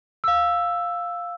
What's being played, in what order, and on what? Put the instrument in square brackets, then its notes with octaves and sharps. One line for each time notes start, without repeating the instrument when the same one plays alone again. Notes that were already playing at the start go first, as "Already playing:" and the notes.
[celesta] F5 E6